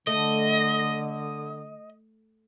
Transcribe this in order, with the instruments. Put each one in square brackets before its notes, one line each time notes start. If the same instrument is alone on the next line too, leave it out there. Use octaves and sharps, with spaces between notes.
[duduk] D3 [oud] A3 [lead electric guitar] D#5